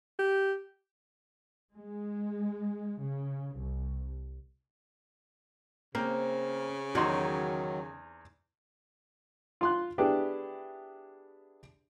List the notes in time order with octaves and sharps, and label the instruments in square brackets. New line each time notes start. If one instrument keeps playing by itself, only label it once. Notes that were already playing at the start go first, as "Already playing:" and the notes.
[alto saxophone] G4
[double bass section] G#3
C#3
C2
[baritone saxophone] C#3 [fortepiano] A#3 [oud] C4
[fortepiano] E2 D#4 C6 [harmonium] D#3 F#3 [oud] F#4
[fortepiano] F4 C6 F#6
B3 D4 E4 G4 G#4